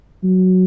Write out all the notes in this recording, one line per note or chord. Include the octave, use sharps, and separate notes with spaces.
F#3